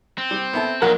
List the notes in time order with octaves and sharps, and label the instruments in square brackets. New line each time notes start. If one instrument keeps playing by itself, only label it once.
[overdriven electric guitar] C4
[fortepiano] G3
B3 E4 A4
[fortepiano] A#1 F#4 F#5 [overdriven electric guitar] F#3 D#4 [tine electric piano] A#4